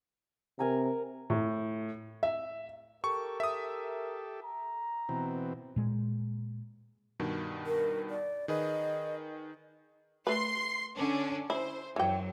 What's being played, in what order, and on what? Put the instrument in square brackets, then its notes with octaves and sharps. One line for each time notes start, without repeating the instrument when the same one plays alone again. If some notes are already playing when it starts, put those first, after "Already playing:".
[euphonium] C3 [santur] A#4 G#5 A#5
[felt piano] A2
E5
[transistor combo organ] G4 A4 [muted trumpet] A#4 [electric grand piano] C#6
[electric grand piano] E5 D#6
[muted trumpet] A#5
[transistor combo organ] B2 E3 C4
[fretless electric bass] A#2 G#3
[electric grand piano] G2 B2 D#3
[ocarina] A#4
D5
[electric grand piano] D#3 G#4 B4 [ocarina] D#5
[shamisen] A3 B4 [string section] C6 C7
[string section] D3 C#4 D4
[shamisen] E4 [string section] C5
[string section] F#2 F#3 [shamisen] E3 G5